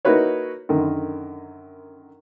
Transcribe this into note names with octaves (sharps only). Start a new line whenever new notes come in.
A#3 D#4 E4 F#4 B4 C#5
F#2 D3 D#3